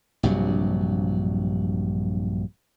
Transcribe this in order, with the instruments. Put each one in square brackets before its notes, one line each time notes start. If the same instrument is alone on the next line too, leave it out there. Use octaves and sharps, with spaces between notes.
[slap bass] A#1 G2 C3 F#3